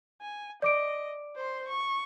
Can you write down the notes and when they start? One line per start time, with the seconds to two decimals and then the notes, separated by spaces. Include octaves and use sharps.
0.21 G#5
0.62 D5 D#5 D6 D7
1.36 C5 C6
1.68 C#6